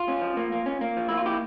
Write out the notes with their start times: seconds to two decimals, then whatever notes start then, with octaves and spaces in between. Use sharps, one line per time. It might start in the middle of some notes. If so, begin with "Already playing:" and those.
Already playing: F4
0.08 C#4
0.22 F3
0.37 A#3
0.52 A#3
0.66 C#4
0.81 A#3
0.97 F3
1.09 A#3 E4
1.17 F4
1.26 E4 G4